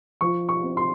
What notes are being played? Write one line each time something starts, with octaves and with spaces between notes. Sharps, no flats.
F3 C#6
C#6
C4
C6